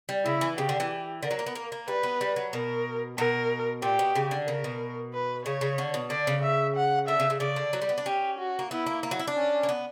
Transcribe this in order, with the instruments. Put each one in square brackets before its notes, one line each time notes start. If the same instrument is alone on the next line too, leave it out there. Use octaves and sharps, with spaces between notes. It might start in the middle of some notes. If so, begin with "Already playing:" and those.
[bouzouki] G3
[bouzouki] C#3 [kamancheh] E4
[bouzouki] E3
[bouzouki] C#3 [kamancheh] G4
[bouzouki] D3
E3
[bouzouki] D3 [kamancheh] A#4
[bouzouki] F#3
A#3
B3
A#3
A#3
[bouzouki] G3 [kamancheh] B4
[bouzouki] B3
G3
F#3
[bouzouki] B2 [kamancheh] A#4
[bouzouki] B2 [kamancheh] A#4
[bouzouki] A#2 [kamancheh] G4
[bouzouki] B2
C#3
D3
[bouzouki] C#3 [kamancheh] A#4
[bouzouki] B2
[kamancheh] B4
[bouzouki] C#3 [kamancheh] C#5
[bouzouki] C#3
D3
B2
[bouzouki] D3 [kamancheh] D5
[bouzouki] C#3
[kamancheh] E5
F#5
[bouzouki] D3 [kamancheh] E5
[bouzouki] C#3
C#3
[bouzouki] C#3 [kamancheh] D5
[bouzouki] D3
F#3
G3
B3
D4
[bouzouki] C#4 [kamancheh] G4
[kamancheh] F#4
[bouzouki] A#3
[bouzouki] B3 [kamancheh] E4
[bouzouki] A#3
A#3
F#3
E4
D4
[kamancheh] C#4
[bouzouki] A#3
B3